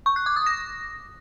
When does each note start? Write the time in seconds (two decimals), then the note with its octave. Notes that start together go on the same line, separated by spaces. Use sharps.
0.06 C#6
0.16 F#6
0.26 D6
0.36 D#6
0.46 A#6